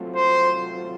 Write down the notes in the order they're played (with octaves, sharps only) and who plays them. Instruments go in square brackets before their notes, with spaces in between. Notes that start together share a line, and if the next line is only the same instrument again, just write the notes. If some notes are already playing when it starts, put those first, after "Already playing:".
Already playing: [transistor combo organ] F#3 A3 C4 F4
[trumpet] C5